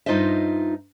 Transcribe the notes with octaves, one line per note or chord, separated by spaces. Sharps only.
G2 D#4 F4 C5 D#5 E5